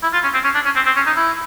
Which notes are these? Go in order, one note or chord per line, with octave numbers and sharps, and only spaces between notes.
E4
F4
C#4
C4
C#4
D4
C#4
C4
C4
C#4
D#4
E4